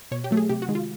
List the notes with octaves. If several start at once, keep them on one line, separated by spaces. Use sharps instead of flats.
B2 C#5
G4
F#3 A3
G#4
C3 G4
F#4
D#3 G#3
F4